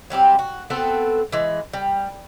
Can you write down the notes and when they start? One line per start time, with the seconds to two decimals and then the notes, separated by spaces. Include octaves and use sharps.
0.10 F#3 G3 C4 G4
0.39 F#4
0.70 B3 C4 F#4 A4
1.32 E3 G#3
1.73 G3